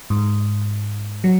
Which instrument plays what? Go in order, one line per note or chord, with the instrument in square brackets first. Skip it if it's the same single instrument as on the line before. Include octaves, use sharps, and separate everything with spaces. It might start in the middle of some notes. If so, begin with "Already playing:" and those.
[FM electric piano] G#2
F#3